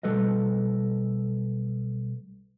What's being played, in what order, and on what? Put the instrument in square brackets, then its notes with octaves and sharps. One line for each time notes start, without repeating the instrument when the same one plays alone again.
[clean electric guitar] B1 G3 A4 B4 D#5